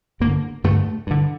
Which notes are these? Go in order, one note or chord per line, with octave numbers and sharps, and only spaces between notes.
G2 D3 A#3
G2 D3 A3
G2 D3